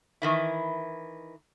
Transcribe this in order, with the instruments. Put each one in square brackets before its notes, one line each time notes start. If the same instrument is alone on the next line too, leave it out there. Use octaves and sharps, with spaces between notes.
[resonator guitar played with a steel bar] D#3 E3 E4